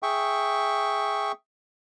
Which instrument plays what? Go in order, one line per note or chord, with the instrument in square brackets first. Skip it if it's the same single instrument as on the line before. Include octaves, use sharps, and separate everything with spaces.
[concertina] G#4 E5 G5 C#6